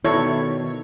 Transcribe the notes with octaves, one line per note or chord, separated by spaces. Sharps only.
B2 D#3 E4 A4 C#5